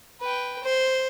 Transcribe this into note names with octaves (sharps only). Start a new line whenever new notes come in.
B4 G5
C5